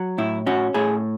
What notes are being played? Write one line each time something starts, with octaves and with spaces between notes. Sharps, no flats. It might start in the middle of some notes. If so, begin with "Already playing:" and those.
Already playing: F#3
A2 E4
C#4 F#4
A2 G#4